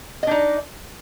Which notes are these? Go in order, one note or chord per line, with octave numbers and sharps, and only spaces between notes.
D4 D#4 D#5